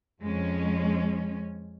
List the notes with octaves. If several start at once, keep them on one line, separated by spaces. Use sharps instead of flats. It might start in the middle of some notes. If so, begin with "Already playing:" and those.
F2 G#3 C#4